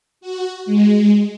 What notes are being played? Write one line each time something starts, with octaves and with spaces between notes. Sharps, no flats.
F#4
G#3